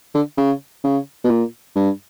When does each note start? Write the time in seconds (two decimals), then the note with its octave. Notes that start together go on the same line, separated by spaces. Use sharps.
0.15 D3
0.38 C#3
0.84 C#3
1.24 B2
1.30 A#2
1.76 G2